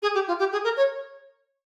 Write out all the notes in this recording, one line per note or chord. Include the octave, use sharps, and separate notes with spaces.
G#4
G4
F4
G4
G#4
A#4
C#5